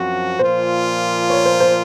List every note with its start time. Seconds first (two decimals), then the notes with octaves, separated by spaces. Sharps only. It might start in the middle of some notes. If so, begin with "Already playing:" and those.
Already playing: F#2 F3 C4 F#4
0.39 A#2 F3 A#3 F4 C5
1.30 C#5
1.46 C5
1.60 C5